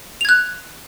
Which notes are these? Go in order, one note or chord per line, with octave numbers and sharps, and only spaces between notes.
F#6 G#6 F7